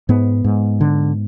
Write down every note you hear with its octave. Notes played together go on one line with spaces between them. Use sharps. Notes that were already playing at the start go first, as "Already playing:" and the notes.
G#2 B3
G#2
D3